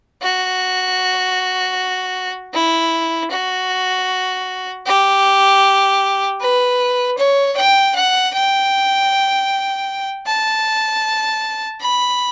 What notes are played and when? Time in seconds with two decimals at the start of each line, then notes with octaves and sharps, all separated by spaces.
0.22 F#4
2.54 E4
3.31 F#4
4.86 G4
6.40 B4
7.18 C#5
7.56 G5
7.95 F#5
8.34 G5
10.26 A5
11.81 B5